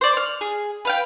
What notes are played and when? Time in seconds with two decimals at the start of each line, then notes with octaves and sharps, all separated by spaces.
0.01 C5 D5
0.17 F6
0.41 G#4
0.85 B4 F5 G5